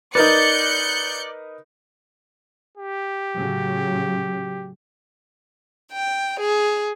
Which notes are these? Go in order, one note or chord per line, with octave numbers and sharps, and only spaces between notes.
D#4 A#4 B4 D5 F#6 G6 C#7
G4
A2 C#3 F#3
G5
G#4